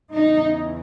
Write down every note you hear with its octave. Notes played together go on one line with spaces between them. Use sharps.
E2 C#3 E3 D#4